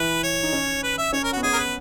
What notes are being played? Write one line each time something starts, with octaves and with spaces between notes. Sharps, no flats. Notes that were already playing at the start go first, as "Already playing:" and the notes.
Already playing: E3 B4
C#5
D#4
C#4
B4
E5
C#4 C#5
A#4
B3 F#4
C#4 G#4
A#4
B4